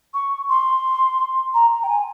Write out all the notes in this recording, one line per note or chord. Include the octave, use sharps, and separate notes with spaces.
C#6
C6
A#5
A#5
G5
G#5